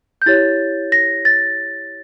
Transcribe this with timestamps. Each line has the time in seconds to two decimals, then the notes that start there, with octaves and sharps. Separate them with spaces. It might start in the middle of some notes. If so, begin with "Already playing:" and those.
0.22 G6
0.26 E4 G4 C#5 A6
0.92 A#6
1.25 A6